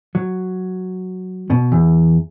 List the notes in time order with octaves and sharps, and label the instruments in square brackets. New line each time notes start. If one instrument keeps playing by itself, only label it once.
[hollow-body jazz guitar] F#3
B2
E2